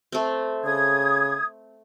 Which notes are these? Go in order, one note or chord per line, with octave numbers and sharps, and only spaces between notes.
A3 C4
C#3 D#6 G#6